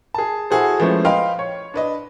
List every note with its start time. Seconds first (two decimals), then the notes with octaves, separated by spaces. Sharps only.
0.14 G#4 A5
0.50 E4 F#4 G#4 A4 C5
0.80 F3 G#3 A3 B3 C#4 E4
1.05 B4 D#5 F5 G5 C6
1.39 C#5
1.74 D4 B4 D#5